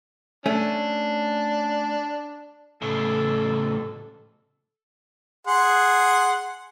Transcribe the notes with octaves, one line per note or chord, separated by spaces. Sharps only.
A3 C#4 D4
A2 C#3 A4
G#4 F#5 C6